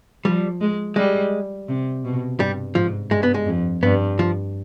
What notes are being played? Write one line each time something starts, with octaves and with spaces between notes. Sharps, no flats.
F3 G3
G#3
G3 G#3
C3
B2
G2 G3
G#2 F3
G2 G#3
B3
G#3
F2
G2 B3
F3